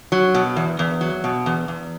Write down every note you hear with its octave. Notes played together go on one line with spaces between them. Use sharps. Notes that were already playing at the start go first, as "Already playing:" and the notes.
F#3
B2
E2
E2
F#3
B2
E2
E2